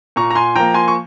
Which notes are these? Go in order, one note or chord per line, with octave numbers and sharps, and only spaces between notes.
A#2 A#5 C#6
A#5
G#5 C6
F3 A#3 G5 A#5
G#5 C6
C#6